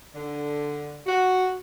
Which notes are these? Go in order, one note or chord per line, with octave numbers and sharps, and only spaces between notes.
D3
F#4